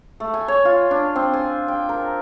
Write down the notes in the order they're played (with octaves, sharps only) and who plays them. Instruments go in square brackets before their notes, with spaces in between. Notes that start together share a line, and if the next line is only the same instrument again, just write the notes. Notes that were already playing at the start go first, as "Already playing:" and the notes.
[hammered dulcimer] A3
G#5
C#5
F4
D4
C4
G#5
G5
A#4